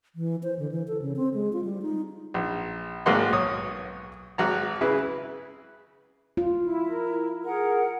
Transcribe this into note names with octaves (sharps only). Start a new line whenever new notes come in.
E3
C5
D3
E3
A4
C#3
C4
G#3
F4
G3
D#4
A#1
G#1 G#2 A#3 F#5 C6
B1 C#5 D#6
G#1 F#4 A#5
C#3 E4 B4
F4
E4
A#4
G#4 A#4 F#5